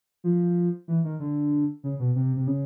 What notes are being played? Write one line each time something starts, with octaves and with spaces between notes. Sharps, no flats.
F3
E3
D#3
D3
C#3
B2
C3
C3
C#3